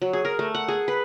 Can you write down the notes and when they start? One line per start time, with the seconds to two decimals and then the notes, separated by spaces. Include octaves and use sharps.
0.02 F#3
0.13 G#4
0.25 A#4
0.39 A3
0.55 F#5
0.68 G#4
0.88 B4